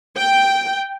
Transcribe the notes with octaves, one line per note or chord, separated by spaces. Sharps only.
G5